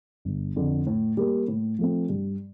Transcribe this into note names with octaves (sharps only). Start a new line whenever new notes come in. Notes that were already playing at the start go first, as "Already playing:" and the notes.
G1
F2 D3
A2
G3 A#3
A2
F3 A3 C4
G2